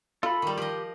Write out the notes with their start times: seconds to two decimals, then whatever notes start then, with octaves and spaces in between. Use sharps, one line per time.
0.23 F4 A4 B5
0.42 D#3 G3
0.58 F3 G4 D#5